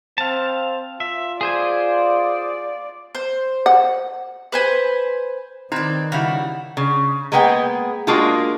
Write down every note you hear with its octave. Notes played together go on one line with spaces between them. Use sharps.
C4 F5 A5
F4 E5
G#4 C5 D5 G#5
C5
F#5
B4 C5 G#5
D#3 C4 D#4 B4 D5
C#3 G3 E4 F#4
C#3
G#3 A#3 B3 G#4 G5
G#3 A#3 D4 F4 F#4 G#4